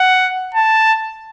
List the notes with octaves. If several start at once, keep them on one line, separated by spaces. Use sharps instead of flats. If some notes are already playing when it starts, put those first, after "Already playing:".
Already playing: F#5
A5